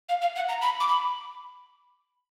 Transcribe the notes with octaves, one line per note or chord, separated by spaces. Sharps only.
F5
F5
F#5
A#5
B5
D6
B5